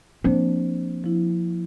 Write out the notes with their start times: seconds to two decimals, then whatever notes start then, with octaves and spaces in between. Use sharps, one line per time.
0.24 F3 A#3 C4 D4 C5
1.04 F3 E4